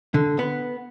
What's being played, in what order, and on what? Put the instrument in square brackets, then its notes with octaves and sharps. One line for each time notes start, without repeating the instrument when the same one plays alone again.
[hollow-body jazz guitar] D3
B3